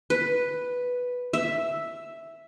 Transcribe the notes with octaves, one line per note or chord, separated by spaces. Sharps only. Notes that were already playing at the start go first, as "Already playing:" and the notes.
B4
E5